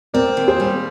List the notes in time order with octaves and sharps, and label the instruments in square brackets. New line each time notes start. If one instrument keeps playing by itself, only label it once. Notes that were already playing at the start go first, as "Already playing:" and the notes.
[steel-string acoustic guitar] C4 [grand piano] A#4 D5
[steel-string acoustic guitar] D#2
[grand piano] G#4 C5
[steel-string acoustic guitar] G3